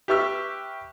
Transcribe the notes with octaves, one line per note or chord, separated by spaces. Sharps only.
G4 B4 E5 C#6 E6 F6